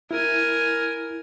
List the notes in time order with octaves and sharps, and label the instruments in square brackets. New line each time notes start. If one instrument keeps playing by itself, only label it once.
[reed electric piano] E4 [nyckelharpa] A#4 G#5